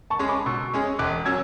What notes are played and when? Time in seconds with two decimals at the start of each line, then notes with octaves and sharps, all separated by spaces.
0.10 A5 C#6
0.19 G#3 C#4 G#4
0.28 B5 D6
0.46 B2 C#6 E6
0.74 G#3 C#4 G#4
0.99 E1 D6 F#6
1.25 F#3 C#4 E6 G#6